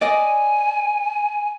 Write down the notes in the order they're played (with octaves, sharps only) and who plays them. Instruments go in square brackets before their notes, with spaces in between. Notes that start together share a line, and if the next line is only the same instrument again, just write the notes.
[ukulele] D5 D#5 [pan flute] G#5